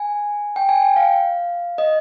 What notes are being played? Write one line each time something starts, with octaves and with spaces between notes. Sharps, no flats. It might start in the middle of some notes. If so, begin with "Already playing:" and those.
Already playing: G#5
G5
G#5
G5
F5
D#5